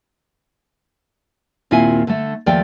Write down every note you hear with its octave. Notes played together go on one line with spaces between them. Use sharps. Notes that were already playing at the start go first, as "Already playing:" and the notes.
D#2 A#2 C4 E4 F4 G#5
D3 A3
D#2 F3 A3 D5 G5